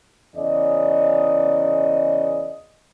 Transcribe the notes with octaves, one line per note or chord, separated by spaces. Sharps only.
E2 C#3 D5 D#5